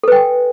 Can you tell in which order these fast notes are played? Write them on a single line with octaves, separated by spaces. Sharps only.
A4 B4 G5 G#5